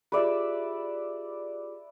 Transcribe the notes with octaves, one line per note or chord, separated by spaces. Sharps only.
F4 G4 G#4 B4 D5 E5